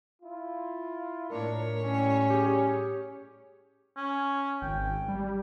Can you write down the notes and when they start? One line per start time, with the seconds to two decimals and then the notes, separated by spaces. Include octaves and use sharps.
0.22 E4 F4
1.30 A2 D4 A#4 C#5
1.84 G3 C#4
2.30 G4 G#4
3.96 C#4
4.62 G#1 G5
5.08 G3